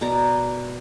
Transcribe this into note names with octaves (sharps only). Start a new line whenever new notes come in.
B2 A#4 D5 A#5